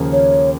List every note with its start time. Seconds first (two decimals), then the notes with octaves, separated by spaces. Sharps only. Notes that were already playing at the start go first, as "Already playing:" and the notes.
Already playing: D#2 C#3 F3 A#3
0.12 C#5